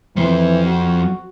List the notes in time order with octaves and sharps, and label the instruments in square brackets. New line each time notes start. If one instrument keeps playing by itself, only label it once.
[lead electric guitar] F2 C5 [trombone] E3
[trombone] F#4